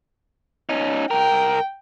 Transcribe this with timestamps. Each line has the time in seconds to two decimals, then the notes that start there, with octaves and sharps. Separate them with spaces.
0.69 C#4 D#4
1.11 C2 A#4 G5